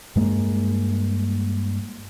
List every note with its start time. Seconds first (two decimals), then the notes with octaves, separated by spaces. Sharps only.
0.16 G2 G#3 A#3